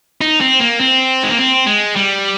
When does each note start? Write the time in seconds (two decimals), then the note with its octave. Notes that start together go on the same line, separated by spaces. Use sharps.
0.21 D#4
0.41 C4
0.60 A#3
0.79 C4
1.23 G#3
1.30 A#3
1.38 C4
1.67 G#3
1.96 G3